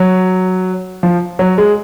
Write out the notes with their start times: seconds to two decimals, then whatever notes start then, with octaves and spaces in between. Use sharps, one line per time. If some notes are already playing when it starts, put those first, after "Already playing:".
Already playing: F#3
1.03 F3
1.39 F#3
1.58 G#3